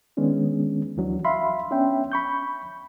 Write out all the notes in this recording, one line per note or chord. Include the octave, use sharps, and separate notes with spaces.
D#3 G#3 B3 C#4 D4
D2 E3 F#3 D4
E5 F5 B5 C6
B3 C#4 D4 E5 G5
B5 C#6 G6